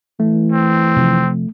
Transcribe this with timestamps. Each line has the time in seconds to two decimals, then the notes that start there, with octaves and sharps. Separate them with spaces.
0.20 E3 A3
0.52 C4
0.96 C3 F3